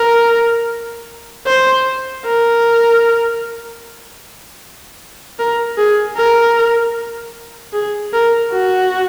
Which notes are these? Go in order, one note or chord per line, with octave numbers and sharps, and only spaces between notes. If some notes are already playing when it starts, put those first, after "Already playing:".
Already playing: A#4
C5
A#4
A#4
G#4
A#4
G#4
A#4
F#4